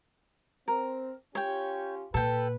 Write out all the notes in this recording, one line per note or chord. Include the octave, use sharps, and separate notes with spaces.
C4 A#4
C#4 F4 G4 C#5 G5
A#2 A4 B4 G5